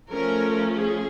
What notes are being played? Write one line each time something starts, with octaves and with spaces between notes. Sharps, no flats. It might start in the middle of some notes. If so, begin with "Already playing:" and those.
F3 A3 C#4 A#4
G#4